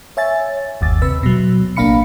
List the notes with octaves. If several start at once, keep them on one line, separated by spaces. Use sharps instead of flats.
C#5 E5 G#5 A6
G1 D#2 A6
C3 B4 E6
B2 F#3
A1 A#3 D4 F5 B5 C#7